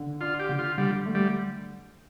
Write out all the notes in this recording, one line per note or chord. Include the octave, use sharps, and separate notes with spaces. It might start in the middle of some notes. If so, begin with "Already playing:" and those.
Already playing: D3
D4 F4
G4
D3
F4
D3 G3
A3
G3